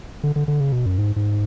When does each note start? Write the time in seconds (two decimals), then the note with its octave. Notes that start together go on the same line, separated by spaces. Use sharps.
0.23 D3
0.36 D3
0.48 D3
0.60 C#3
0.72 B2
0.86 F#2
0.98 G#2
1.16 G#2